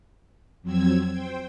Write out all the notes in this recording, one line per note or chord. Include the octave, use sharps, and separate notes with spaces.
F2 F#3 C4 E6 G#6
C5 G5